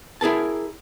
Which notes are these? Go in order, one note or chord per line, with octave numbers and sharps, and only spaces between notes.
E4 G#4 A#4 A5